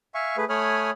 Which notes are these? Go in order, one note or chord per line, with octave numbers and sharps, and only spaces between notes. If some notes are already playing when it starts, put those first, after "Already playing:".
E5 F5 G#5 C#6
A3 G#4 B4
A3 C#5 G#5 B5 D#6 F6